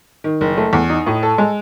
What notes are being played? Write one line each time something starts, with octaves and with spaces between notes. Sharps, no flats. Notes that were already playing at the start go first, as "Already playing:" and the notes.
D#3
F#1
A3
E2
D#4
A2
A4
G#3